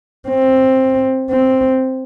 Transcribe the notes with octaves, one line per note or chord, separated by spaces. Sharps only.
C4
C4